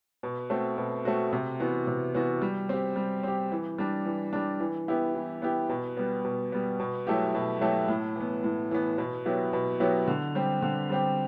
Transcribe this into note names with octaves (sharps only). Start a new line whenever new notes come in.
B2
A3 C4 F#4
B2
A3 C4 F#4
C3
E3 B3 F#4
C3
E3 B3 F#4
G3
C4 G4
G3
C4 G4
E3
G3 D4
E3
G3 D4
E3
B3 E4 G4
E3
B3 E4 G4
B2
G3 B3
B2
G3 B3
B2
F#3 A3 E4 G4
B2
F#3 A3 E4 G4
A2
E3 B3
A2
E3 B3
B2
F#3 B3 E4 G4
B2
F#3 B3 E4 G4
D3
G3 C4 G4
D3
G3 C4 G4